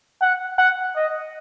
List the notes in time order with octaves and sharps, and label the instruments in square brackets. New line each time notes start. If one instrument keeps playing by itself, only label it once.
[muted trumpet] F#5
F#5
D#5